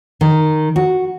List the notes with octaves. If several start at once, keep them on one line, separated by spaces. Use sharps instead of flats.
D#3
F#4